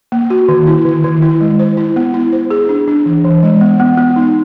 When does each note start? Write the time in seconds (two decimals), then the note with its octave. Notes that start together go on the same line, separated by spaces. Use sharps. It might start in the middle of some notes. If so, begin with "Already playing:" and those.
0.12 A#3
0.30 F#4
0.48 D#3
0.67 E4
0.85 D#3
1.04 D#3
1.22 E4
1.41 G#3
1.59 C5
1.77 E4
1.96 B3
2.14 E4
2.33 C5
2.51 G#4
2.69 D4
2.88 D4
3.06 E3
3.24 E3
3.43 G#3
3.61 B3
3.80 B3
3.97 B3
4.16 D#4